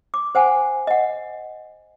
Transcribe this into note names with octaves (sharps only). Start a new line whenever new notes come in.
D6
C5 F#5 G#5
D#5 F#5